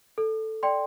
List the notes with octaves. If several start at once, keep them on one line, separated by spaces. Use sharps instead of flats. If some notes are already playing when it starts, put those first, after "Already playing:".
A4
D5 G5 C6